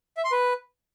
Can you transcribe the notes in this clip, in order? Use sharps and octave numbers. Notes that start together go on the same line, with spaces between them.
E5
C6
B4